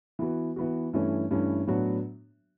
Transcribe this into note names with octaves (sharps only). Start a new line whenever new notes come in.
E3 B3 F#4
E3 B3 F#4
G2 E3 A3 C#4
G2 E3 A3 C#4
A2 F#3 B3 D4 F#4